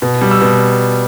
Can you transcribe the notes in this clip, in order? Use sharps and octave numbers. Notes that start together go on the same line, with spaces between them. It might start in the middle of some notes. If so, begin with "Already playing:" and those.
B2
G3
E6
B2